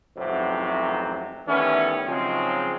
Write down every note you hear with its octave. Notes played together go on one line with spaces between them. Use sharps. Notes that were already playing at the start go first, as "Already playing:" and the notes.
A1 F2 G#2 C3 F#3
D#3 E3 G3 A3 B3 C#4
G#2 C#3 F3 F#3 G#3 C4